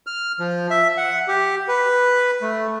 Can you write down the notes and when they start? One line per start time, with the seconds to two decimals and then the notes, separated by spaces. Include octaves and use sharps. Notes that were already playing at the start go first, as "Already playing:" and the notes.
0.07 F6
0.40 F3
0.70 E5
0.97 F#5
1.28 G4
1.68 B4
2.42 A3